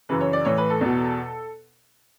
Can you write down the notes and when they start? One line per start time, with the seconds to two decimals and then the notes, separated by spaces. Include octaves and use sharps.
0.09 F#2 C#3 E3 B4
0.21 C#5
0.33 D5
0.45 A2 E3 C#5
0.58 B4
0.70 A4
0.81 E2 B2